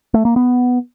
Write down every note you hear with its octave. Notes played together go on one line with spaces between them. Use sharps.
A3
A#3
B3